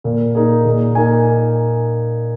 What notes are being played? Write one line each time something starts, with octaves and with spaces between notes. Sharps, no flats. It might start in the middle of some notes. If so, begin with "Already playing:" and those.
A#2 A#4
A#3 D#4 G#4
A#2
A#3 D#4 G#5